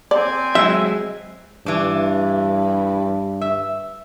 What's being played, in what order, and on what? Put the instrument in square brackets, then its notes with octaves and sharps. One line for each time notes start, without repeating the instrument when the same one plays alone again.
[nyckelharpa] C4 G#5 [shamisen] D5
[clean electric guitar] F#3 G#3 [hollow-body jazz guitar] E5
[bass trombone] G2 [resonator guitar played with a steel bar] E3 D4
[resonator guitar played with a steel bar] E5